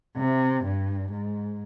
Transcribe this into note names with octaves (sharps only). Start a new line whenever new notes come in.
C3
G2
G#2